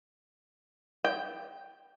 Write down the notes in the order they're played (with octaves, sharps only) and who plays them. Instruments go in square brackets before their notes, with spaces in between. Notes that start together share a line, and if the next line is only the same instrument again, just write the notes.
[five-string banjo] G5